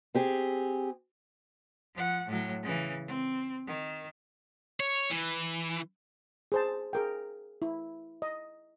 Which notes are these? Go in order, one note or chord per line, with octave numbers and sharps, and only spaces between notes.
C4 G4 G#4
F3 F#5
A2 F#3
C#3 E3
C4
D#3
C#5
E3
G#4 C5 A5
G#4 A#4 G5
E4
D#5